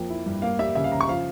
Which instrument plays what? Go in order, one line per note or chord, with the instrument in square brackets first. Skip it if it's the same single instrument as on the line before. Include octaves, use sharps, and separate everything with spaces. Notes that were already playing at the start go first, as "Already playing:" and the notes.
Already playing: [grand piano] F2 F3 A#3 G5
E4
G2
A#3 F5
G3 E5
C#3 E5
F5
C#3 A#5
C#6
F3 F5